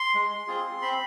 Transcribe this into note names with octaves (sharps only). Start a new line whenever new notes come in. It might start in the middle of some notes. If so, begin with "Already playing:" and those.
Already playing: C6
G#3
C4 F4 G#4
C4 B5